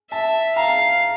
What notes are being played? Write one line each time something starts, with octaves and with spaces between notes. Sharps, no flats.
E5 A5
F5 A#5